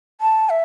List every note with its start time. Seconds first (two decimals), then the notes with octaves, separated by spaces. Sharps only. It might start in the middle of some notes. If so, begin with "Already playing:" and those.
0.21 A5
0.50 E5